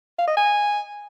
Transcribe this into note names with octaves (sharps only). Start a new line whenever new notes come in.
F5
D#5
G#5